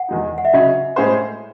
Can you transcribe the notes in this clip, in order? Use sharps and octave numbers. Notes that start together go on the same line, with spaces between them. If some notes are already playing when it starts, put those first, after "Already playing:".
Already playing: F#5
E2 D#3 G#3 D#4
F#5
E5
C#3 F#3 C#4 D#5
A2 G#3 C#4 G#4 C5